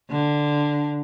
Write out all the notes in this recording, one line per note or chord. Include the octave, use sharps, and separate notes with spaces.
D3